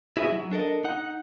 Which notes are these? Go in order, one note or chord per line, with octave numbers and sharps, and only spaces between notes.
E4 F#4 G#4 D5 E5
F#3
D4 A4 A#4 D#5
D#4 F#5